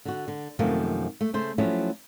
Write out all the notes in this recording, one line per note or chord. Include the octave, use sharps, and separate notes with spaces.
D3 F#4
D3
F#2 C3 D#3 F3 A3 A#3
A3
C#3 A3 C5
F3 F#3 A3 C#4 E4